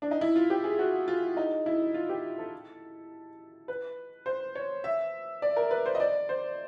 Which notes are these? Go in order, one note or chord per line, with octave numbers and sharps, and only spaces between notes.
D4
D#4
E4
F4
G4
G#4
F#4
F4
D#4
E4
F4
G4
A4
B4
C5
C#5
E5
D5
A#4
B4
C5
D#5
D5
C5